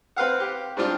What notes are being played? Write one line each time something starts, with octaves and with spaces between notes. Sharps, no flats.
C4 B4 F5 F#5
G4
G#2 G3 C4 D4 F4